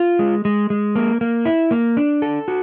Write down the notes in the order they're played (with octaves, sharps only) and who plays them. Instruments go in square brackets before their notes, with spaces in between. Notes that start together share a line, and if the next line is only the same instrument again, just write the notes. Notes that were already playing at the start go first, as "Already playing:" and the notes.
Already playing: [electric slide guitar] F4
G#3
G#3
G#3
A#3
A#3
E4
A#3
D4
A4
F#4